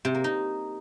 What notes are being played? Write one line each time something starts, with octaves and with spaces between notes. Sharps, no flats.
C3
A#3
D#4